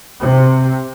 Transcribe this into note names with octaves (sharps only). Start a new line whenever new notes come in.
C3